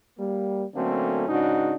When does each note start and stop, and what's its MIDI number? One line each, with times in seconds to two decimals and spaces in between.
0.19 0.64 55
0.19 0.64 58
0.75 1.26 50
0.75 1.26 54
0.75 1.26 57
0.75 1.26 58
0.75 1.26 60
0.75 1.26 61
1.28 1.74 44
1.28 1.74 49
1.28 1.74 62
1.28 1.74 63
1.28 1.74 66